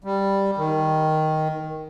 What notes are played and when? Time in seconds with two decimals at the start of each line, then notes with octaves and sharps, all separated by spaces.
0.04 G3
0.57 D#3